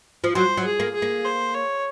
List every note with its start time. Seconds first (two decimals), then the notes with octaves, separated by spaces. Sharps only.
0.24 F3
0.35 F#3 C5
0.57 F#3
0.65 G#4
0.80 A#3
0.95 G#4
1.02 A#3
1.25 C5
1.54 C#5